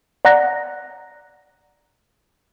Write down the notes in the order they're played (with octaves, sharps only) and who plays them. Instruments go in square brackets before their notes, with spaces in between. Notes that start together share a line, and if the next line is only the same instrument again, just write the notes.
[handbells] D5 F#5 A#5 F#6 A#6